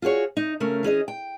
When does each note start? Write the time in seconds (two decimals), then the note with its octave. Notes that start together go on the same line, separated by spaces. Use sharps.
0.02 F4 F#4 G#4 C#5
0.37 D#4
0.60 C#3 A3 C#4 A#4
0.83 E3 C#4 G#4 D#5
1.08 G5